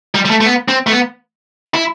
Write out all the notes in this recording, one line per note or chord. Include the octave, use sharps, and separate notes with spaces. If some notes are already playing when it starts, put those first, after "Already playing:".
G3
G3
A3
A3
B3
C4
A3
B3
E4